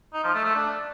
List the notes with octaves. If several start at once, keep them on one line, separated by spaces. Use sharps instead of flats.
D#4
F3
A3
A3
D4